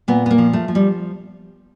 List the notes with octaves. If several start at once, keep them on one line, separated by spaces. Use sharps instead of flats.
A#2 B3
B3
A#3
F3
A3
F3
G3